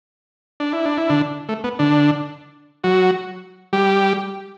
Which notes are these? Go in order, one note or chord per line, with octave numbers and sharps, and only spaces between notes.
D4
E4
D4
E4
D3 D4
A3
B3
D3 D4
F#3 F#4
G3 G4